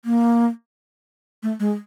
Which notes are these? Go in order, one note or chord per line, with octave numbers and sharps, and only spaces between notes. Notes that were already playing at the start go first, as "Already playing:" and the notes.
A#3
A3
G#3